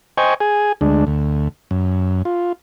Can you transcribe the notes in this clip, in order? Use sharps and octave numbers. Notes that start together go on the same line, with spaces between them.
C5 D#5 G5 G#5 C#6
G#4 G#5
D2 G#3 D4
D2
F#2
F4